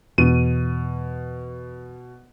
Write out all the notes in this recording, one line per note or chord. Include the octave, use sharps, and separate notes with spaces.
E2 B2 D#7